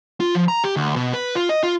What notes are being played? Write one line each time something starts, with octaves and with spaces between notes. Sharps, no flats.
F4
F3
A#5
G4
D2
B2
B4
F4
D#5
F4